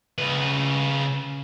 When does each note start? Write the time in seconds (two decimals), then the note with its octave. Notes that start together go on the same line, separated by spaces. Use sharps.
0.18 C#3 B4